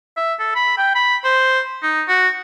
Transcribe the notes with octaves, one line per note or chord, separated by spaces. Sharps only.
E5
A4
B5
G5
B5
C5
D#4
F#4